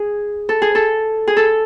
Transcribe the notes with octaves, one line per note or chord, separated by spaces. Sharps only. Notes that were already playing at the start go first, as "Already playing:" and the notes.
Already playing: G#4
A4
G#4
A4
G#4
A4